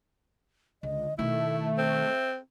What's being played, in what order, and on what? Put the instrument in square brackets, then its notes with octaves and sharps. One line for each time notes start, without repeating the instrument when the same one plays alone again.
[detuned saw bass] C#2 [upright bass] D3 [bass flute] D#5
[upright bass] B2 D#3 [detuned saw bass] A3 [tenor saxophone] E4 [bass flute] E5
[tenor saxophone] C4